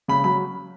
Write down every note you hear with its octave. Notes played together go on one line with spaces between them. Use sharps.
C#3 B5
F#3 B5